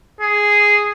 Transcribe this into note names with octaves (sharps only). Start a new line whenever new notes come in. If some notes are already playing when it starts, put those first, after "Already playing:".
G#4